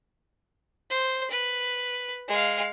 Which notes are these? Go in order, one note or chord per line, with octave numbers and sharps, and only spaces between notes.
C5
B4
G#3 F5